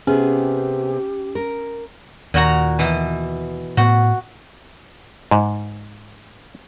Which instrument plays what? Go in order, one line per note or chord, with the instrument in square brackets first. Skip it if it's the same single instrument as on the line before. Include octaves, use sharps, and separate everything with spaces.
[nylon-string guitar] C3 B3 G#4 [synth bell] C#4 [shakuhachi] G4
[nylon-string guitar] A#4
[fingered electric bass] D#2 [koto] A#2 F#4 A#5
[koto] B2 E3
[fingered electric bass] A2 B3 [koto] F#4
[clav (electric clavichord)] G#2